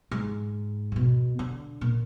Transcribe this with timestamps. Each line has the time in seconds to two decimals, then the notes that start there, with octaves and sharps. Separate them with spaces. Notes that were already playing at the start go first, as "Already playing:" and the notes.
0.11 G#2
0.92 D3
0.96 B2
1.39 D3
1.81 A#2